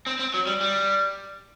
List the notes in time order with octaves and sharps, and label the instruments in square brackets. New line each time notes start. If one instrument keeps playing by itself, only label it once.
[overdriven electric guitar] C4
C4
F#3
G3
G3